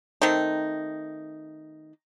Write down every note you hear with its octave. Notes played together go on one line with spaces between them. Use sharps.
D#3 A3 C4 D#4